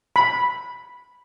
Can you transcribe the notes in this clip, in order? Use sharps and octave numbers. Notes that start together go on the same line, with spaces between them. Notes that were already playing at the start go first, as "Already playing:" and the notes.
B5